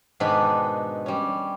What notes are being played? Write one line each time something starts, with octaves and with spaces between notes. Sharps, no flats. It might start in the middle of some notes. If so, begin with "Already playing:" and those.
G#2 B2 D#3 G#3 D4 B5
G3 C#4